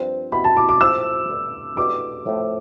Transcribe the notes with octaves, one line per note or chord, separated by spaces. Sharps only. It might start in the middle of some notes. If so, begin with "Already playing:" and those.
Already playing: G2 F3 C4
B2 B3 E4 G4 B5
A5
D6
D6
F3 A3 E4 G4 E6
G2 D3 A3
E2 B2 A3 D4 G4 D6
A2 F3 A3 C4